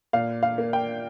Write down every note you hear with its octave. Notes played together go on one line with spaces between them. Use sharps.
A#2 F5
F5
A#3
G5